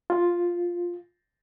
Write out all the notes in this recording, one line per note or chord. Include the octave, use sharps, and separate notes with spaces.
F4